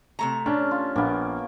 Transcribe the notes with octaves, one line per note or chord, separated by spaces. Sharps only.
C3 A3 A#5
C#4 D4 A5
F4
A#1 A#3 B3